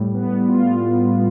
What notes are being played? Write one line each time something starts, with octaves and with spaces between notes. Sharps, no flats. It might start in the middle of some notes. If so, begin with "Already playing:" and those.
Already playing: A2 G3
B3
F4